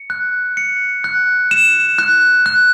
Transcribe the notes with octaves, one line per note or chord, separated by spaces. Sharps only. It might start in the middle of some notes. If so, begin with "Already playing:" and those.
Already playing: C#7
F#6
C#7
F#6
E7
F#6
F#6